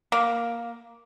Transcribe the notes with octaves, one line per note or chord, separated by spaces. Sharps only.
A#3